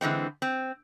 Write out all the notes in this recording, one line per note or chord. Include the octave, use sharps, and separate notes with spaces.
D3 E3 G#3 C4
C4